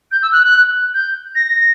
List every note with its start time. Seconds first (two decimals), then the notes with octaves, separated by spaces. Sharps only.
0.11 G6
0.22 E6
0.32 F#6
0.42 F#6
0.94 G6
1.35 A#6